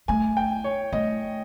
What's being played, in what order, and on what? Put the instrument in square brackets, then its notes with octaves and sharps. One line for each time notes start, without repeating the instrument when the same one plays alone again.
[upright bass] A3 [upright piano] G#5
[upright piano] G5
C#5
[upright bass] A3 [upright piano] D#5